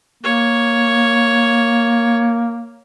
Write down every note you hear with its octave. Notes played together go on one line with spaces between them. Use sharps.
A#3 C#5